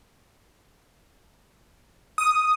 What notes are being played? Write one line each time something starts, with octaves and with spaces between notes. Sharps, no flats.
D#6